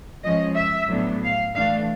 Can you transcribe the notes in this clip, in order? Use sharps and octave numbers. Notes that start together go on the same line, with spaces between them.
F3 G#3 C#4 D#5
E5
A2 F#3 B3 D4
F5
E3 A3 D4 F5